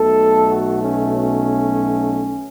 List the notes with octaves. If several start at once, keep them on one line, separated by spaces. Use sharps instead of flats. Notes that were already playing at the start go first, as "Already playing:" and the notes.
Already playing: B1 B2 A3 A4
F#4
C#4
C#4